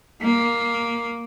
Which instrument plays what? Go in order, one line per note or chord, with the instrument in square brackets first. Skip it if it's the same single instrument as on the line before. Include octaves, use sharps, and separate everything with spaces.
[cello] A#3